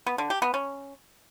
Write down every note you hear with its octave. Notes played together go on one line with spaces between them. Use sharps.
B3
D3
G4
B3
C#4